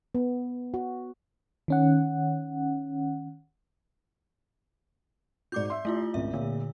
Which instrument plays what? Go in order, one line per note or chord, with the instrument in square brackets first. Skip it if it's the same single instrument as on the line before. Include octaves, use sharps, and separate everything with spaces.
[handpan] B3
F#4
[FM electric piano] D#3 C#4 F#5
[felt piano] G#2 F#4 [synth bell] D5 D6 G6
[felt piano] E5 C6
[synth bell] A3 E4 F4
[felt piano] G#1 C#2 [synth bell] E5
[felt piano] A#2 [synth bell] D3